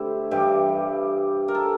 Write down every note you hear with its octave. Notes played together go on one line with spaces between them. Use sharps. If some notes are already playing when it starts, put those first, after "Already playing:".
Already playing: D3 A3 C4 E4 G4
G2 E3 G3 G4
A#4
A4